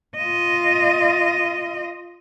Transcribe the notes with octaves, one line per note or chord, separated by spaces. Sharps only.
F4 D#5